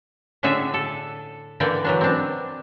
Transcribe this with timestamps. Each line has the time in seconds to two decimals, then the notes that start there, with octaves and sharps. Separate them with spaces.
0.43 A2 D3 D4 G#4 E5
0.74 A4
1.60 D3 E3 A#3 D5 G5
1.85 E3 F#3 D4
2.01 C4 D4